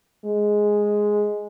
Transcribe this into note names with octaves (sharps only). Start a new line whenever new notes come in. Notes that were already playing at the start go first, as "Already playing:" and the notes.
G#3